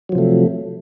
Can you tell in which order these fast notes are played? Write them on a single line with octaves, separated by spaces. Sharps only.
F#3 F3 C3 A3